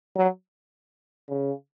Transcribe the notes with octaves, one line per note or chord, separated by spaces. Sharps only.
F#3
C#3